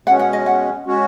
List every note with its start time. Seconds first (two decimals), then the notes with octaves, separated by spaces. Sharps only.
0.06 B2 G#3 C#4 F#5
0.19 F#5
0.33 D#5
0.46 F#5
0.87 G#3 C#4 F#4